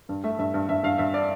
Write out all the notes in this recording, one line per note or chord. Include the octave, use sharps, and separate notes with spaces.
G2
A3 E5
G2 E5
G2
G2 E5
G2 F5
G2 E5
D5